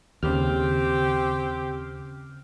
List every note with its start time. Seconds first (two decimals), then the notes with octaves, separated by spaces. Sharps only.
0.23 D#2 C#3 C4 G4 F6